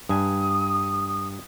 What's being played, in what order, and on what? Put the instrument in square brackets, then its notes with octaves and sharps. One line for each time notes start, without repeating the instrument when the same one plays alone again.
[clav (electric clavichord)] G2 G#5 [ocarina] D#6